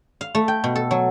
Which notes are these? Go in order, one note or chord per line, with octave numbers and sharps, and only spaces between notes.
F5
A3
G5
B2
A4
F#3